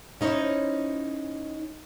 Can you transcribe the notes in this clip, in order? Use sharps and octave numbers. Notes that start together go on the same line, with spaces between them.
C#4 D#4 E4 C5 C#5